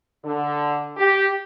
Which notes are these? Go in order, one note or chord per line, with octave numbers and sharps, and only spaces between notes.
D3
G4